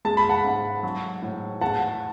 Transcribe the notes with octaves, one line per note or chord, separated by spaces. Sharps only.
G#3 A5
B5
F#5 A5
G#2
F#3
A2
E2 F#5 A5